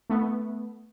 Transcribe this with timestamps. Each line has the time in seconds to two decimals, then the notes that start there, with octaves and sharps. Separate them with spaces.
0.10 A3 B3